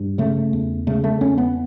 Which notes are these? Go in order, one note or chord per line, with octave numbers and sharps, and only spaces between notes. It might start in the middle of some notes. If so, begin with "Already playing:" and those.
Already playing: G2
C#3 A3
E2
C#3 A3
A3
E2 C#4
B3